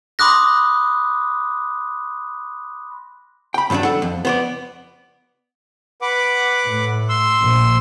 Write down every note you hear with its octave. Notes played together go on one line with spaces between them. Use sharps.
B5 C6 D6 D#6 F#6 A#6
G5 B5
G2 D#3 E3 F#3 D4
A4 F#5
F2
B3 C5 D5
B4 F#5 D6
A2
C6 E6
A#1